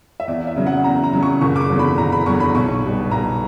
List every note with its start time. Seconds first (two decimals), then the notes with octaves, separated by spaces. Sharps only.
0.20 E5
0.28 E2 D5
0.47 E5
0.56 C#3 F#3
0.66 F#5
0.84 E2 A#5
1.04 A#5
1.13 C#3 F#3
1.23 C#6
1.41 F#1 C#6
1.56 D6
1.61 C#6
1.70 E2 D3 F#3
1.79 B5
1.98 F#1 A#5
2.12 B5
2.26 E2 D3 F#3 C#6
2.40 B5
2.55 B1 C#6
2.83 B2 G3
3.11 B1 A#5